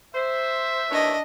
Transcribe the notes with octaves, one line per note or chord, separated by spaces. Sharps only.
C5 E5
D#2 E3 D4 C#5 D#5